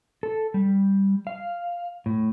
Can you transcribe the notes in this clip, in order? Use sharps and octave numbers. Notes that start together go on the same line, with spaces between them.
A4
G3
F5
A2